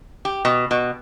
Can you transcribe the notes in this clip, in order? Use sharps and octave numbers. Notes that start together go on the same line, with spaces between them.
G4
B2
B2